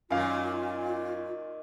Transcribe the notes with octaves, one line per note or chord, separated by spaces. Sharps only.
F#2 A#2 D#3 F4 F5